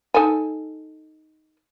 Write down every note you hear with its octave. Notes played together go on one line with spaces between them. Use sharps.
D#4 A4 G#5